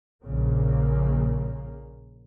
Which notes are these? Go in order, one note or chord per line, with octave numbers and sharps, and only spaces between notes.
A#1 A#2 C#3 A#3